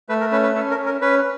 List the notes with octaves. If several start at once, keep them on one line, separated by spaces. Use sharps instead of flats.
A3 B4
A#4
C#4 B4
B4
C#4 A4
A#4
C#4
A#4
C#4 B4